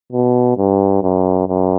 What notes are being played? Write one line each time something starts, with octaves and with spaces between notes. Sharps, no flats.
B2
G2
F#2
F#2